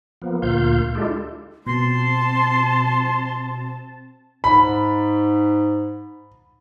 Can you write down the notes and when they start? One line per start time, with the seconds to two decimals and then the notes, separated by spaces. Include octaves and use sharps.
0.22 F3 A#3 B3
0.42 D2 A#2 A#3 F4 F5 G6
0.95 G#3 D4 E4 F4 G4 A4
1.67 B2 C4 A5 C6
4.44 G#2 B5